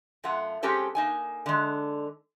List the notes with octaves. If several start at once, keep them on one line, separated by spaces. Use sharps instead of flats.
F#2 A3 F4 F#5
G#3 C4 C#4 G4 A4 C#5
A#3 D#4 G#5
D3 G#3